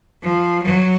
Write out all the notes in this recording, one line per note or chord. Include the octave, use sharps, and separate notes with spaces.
F3
F#3